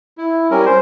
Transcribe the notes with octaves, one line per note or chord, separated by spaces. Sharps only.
E4
G3 C#4 A#4
C5